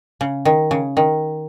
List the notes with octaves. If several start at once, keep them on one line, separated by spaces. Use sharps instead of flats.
C#3
D#3
C#3
D#3